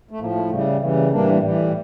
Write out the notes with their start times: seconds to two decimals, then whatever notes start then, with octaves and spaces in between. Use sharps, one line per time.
0.11 A3
0.19 A2 F3 A#3
0.35 A3
0.50 C#3 E3 G3 A3
0.81 C#3 E3 G3 A3
0.96 A#3
1.11 A2 E3 G3 A#3 D4
1.42 A2 E3 G3